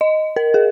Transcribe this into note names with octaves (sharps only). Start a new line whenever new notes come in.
D#5
A#4
G#4